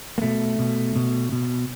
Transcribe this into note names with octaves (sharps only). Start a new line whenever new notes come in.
A#3
B2 A3
B2
B2
B2